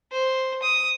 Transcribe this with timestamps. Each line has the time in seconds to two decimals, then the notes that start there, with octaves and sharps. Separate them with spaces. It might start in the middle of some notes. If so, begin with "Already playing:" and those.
0.12 C5
0.63 D#6